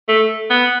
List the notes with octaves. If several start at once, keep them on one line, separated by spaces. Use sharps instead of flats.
A3
B3